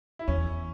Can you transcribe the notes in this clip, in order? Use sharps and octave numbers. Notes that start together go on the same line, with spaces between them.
E4
E2 C#4